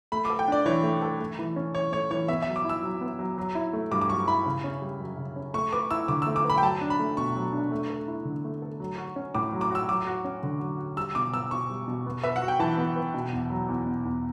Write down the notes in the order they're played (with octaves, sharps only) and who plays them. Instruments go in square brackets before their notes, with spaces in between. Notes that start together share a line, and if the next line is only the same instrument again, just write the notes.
[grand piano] A3 [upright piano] B5
[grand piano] A4 [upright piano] D6
[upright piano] G5
[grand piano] D4 [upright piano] D5
[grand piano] E3 [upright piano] C#5
[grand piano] A3
A4
A3
E3
C#4
[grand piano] E3 [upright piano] C#5
[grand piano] A3 [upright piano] C#5
[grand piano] E3 [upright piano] C#5
[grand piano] B3 [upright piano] E5
[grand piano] F#3 [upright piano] E5
[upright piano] D6
[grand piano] E4 [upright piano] E6
[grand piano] F#3
B3
F#3
F#3
E4
A3
[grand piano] G2 [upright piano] D6
[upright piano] D6
[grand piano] F#3 [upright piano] C#6
[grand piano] E4 [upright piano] B5
[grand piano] C#3
C#4
G3
F#2
C#3
C#4
[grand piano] A3 [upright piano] C#6
[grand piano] B4 [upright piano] D6
[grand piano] E4 [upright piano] E6
[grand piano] D3 [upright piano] D6
[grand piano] A3 [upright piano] E6
[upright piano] D6
[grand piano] B4
[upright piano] B5
G5
[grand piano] F#3 [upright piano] A5
[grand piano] D4
[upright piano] B5
[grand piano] A3
[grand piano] B2 [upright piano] C#6
[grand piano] F#3
D4
A3
A4
E4
D3
A3
A4
F#3
F#4
C#4
[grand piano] A2 [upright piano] D6
[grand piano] F#3
[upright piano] D6
[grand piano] F#4 [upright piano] E6
[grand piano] F#3 [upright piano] D6
[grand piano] F#4
C#4
D3
F#3
F#4
[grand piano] G3 [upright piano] E6
[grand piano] B2 [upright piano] D6
[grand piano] B3 [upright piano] E6
[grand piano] B2 [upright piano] C#6
[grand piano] G3
B2
B3
[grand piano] B4 [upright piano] E5
[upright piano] F#5
[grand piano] F#4
[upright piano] G5
[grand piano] E3 [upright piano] A5
[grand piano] B3
B4
B2
E2
F#3
E2
B2
E2